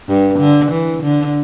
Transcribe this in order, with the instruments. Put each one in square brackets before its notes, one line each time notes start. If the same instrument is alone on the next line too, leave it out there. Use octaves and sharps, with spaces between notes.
[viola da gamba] G2
D3
E3
D3